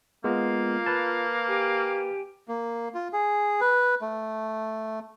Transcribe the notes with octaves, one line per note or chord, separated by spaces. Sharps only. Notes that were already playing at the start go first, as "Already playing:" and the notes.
G#3 A#3 B3 F4
B4 A5
G4 G#5
A#3
F4
G#4
B4
A3